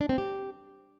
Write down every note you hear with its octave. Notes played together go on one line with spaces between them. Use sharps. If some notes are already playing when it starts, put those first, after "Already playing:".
D4
C4
G4